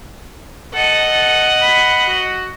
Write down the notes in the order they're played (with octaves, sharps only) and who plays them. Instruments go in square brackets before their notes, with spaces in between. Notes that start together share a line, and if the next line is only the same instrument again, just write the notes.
[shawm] A4 [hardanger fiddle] D#5 F#5
[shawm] A4
B5
F#4